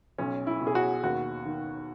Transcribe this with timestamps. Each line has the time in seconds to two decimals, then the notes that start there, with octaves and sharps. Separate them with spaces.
0.18 B1 C#4
0.47 E4
0.61 B2
0.67 G#4
0.75 F#4
1.03 D#2 F#4
1.45 D#3